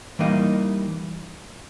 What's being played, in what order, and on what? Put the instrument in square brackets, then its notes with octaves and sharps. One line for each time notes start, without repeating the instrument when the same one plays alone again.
[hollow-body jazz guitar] E3 G3 A#3 D#4 D#5